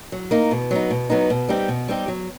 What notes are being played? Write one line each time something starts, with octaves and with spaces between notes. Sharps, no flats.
F#3
A#3 D#4
B2
F#3 B3 D#4
B2
F#3 B3 D#4
B2
G3 C4 D#4 G4
B2
G3 C4 D#4 G4
F#3